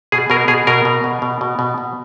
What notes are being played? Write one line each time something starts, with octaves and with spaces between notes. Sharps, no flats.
B2 G#4
B2 A#4
B2 G#4
B2 A#4
B2
B2
B2
B2
B2
B2